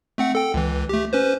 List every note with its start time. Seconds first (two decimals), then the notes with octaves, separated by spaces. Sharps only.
0.18 A3 C4 F#5
0.35 A4 G5
0.54 C#2 E3
0.89 A3 G4
1.13 C#4 B4 C5